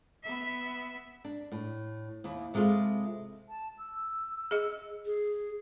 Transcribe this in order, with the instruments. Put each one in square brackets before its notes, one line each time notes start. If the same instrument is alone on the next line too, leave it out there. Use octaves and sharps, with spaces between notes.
[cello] B3 E5
[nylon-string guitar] D4
A2
D#2 E4
C3 G#3 E4 F4 A4
[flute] A5
E6
[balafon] G#4 D#5
[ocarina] G#4